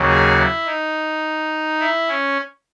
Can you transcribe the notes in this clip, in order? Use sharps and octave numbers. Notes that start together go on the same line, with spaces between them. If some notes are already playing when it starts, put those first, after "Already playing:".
Already playing: D#2 C#3 F#3
G#4
E4
D#4
E4
C#4